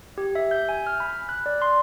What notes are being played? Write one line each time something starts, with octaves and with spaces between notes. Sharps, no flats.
G4
E5
G6
G#5
F6
B5
F#6
D5
C6